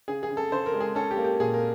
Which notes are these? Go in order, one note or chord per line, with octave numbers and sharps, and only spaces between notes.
C#3 G#4
G#4
C#3
A4
C#3 C5
A#4
G#3
G#4
C#4 A4
G4
A#3
G4
A#2 G#4
A#4